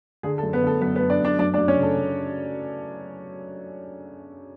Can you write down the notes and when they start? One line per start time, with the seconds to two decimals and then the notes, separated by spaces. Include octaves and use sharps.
0.23 D3 G#4
0.38 A4
0.43 F#2
0.53 B3 B4
0.63 D3 A4
0.81 F#2 B3 B4
0.96 B3 B4
1.00 F#2
1.10 D4 D5
1.20 F#2 D4 D5
1.39 F#2 D4 D5
1.54 D4 D5
1.58 F#2
1.68 C#4 C#5
1.77 C#3
1.82 A4
1.97 C#3